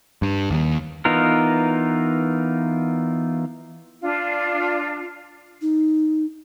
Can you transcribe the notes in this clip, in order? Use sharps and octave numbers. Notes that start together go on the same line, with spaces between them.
G2
D#2
E3 B3 D#4 F4 A#4
D4 F4
D#4